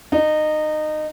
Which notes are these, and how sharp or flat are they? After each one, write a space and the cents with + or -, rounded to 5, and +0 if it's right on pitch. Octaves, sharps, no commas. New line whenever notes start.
D#4 -20